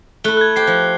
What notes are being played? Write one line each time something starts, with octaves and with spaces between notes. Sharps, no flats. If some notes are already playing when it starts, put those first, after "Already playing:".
A3 E4 F#6 G7
F#6 G#6
G4 C5 C7
F3